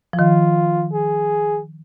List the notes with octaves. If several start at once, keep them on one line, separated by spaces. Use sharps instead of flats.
F3
D#3 F4
G#4